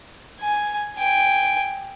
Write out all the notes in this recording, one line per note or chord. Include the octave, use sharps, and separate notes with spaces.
G#5
G5 G#5